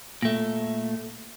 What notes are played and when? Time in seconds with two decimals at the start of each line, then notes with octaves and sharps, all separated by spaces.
0.22 A#2 A3